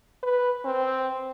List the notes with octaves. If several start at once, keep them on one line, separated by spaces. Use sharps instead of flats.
B4
C4